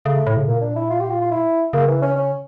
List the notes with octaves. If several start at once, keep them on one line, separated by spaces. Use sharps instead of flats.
C#3 A3
A2
C#3
A#2 A#3
D4
E4
F4
G4
F4
F4
E4
C#3 A#3
E3
C#4
C#4